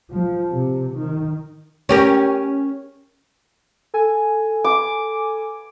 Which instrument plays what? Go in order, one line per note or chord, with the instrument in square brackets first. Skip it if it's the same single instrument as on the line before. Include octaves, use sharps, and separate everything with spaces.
[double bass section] F3
C3
D#3
[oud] C#4 G4 A#4
[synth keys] A4 G#5
[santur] D6